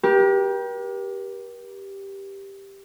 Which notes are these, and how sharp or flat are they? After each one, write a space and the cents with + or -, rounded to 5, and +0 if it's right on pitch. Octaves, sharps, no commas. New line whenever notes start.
G4 +0 A#4 +45